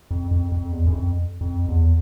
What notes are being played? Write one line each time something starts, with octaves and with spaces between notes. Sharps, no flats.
F2
F2
F2
E2
F#2
F2
F2
E2